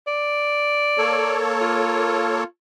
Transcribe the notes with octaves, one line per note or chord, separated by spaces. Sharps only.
D5
A#3 A4 C#5
F4